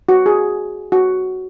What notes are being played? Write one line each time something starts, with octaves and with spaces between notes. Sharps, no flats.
F#4
G#4
F#4